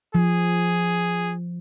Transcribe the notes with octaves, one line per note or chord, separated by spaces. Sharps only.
F3 G#4